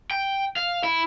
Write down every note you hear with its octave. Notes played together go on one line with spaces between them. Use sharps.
G5
F5
E4